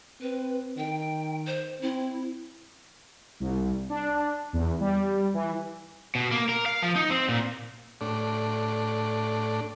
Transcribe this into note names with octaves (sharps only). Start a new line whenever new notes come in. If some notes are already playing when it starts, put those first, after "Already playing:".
C4 B4
D#3 G5
C5
C4 E4
C2
D4
E2
G3
E3
B2
A#3
A#4
F5
F3
D#4
C4
A#2
A2 D4